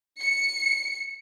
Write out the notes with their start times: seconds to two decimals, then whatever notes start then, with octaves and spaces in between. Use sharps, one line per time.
0.21 C#7